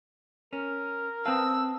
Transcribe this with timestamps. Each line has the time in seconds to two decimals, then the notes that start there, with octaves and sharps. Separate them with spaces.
0.53 C#4 A#4
1.26 C4 B4 F5 A5 D#6 E6